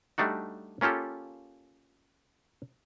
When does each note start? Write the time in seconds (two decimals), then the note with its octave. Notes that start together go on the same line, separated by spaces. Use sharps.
0.18 G3 A3 D4 D#4 F#4
0.81 A#3 C#4 F4 G4 A4